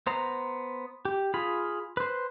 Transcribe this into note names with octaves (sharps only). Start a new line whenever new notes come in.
B3 C5 A#5
G4
F4 G#4 B5
B4 C5